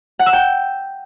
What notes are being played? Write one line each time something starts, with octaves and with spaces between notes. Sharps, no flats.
F#5
E6
G5